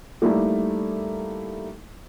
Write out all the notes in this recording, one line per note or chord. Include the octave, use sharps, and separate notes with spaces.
G3 A3 A#3 D#4 E4 D5